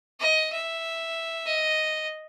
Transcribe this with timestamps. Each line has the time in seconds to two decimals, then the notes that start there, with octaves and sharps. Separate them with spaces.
0.20 D#5
0.53 E5
1.46 D#5